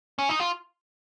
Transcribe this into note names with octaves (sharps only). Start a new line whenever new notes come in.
C#4
D#4
F4